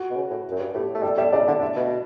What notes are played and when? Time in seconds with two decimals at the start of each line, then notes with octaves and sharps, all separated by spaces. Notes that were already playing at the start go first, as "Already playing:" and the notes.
Already playing: F#4
0.10 B2
0.16 C#3
0.30 A2
0.51 F#2
0.59 G2
0.74 A2 G4
0.94 A3
1.03 G3 A4
1.18 G3 E5
1.32 C#3 D5
1.47 D3 E5
1.61 D3 E5
1.76 B2